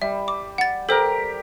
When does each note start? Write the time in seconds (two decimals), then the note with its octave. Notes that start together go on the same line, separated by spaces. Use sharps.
0.02 G3 E5
0.28 D6
0.58 F#5 A6
0.89 G4 A4 A#4 C5